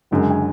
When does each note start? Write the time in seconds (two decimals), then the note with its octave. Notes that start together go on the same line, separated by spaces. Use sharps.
0.11 F#1 F#2 D3 G#3
0.30 G#5